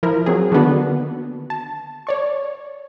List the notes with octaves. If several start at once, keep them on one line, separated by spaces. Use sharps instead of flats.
F3 E4 A#4
F#3 C4 G#4
D3 D#3 A#3 B3 D4 F#4
A5
C#5 D5 C#6